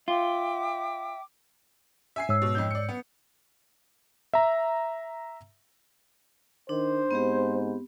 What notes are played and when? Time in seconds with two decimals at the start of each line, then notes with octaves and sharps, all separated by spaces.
0.08 F4 E5 G5 D6
2.16 E5 G#5 C7
2.29 G#2 C#5 E6
2.42 B2
2.55 F2 D#4 G6
2.71 D5 C#7
2.89 B3
4.34 E5 A#5
6.69 D#3 D4 C5
7.11 G#2 B3 C4 G4